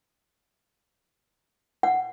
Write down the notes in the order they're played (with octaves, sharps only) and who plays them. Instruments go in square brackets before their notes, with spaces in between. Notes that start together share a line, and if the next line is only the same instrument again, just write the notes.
[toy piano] F#5